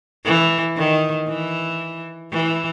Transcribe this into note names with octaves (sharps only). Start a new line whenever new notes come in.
E3
D#3
E3
E3